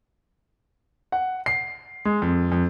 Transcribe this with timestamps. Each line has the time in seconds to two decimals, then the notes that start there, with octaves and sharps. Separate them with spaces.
1.12 F#5
1.46 C7
2.05 G#3
2.22 F2
2.52 F2